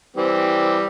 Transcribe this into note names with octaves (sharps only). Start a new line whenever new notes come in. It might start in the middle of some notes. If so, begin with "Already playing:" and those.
E3 G3 C4